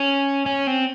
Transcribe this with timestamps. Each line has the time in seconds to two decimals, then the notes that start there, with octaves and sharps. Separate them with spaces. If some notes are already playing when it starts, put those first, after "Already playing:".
Already playing: C#4
0.46 C#4
0.67 C4